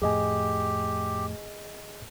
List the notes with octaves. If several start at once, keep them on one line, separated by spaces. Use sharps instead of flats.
F2 A2 G4 G#4 D#5 G#5